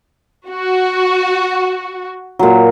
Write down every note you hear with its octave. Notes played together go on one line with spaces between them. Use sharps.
F#4
A#2 F#3